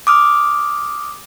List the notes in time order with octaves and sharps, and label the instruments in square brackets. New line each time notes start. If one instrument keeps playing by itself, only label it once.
[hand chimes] D6 D#6 F6